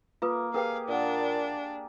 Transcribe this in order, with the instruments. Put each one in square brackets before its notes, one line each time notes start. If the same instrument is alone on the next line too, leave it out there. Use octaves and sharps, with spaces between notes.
[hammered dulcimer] A#3 [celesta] F4 B4 D#6
[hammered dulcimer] G4 G#4 [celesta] A#4 B4 G5 [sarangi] F5
[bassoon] A#2 [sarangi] D4 [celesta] A#4 F#5